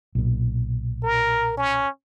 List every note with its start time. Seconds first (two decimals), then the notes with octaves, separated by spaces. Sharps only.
0.15 B1 A#2
1.03 A#4
1.57 C#4